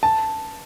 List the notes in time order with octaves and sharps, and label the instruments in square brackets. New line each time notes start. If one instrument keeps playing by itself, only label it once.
[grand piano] A5